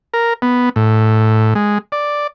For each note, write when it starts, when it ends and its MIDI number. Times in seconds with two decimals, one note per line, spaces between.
0.14 0.33 70
0.42 0.69 59
0.76 1.54 45
1.55 1.78 56
1.92 2.27 74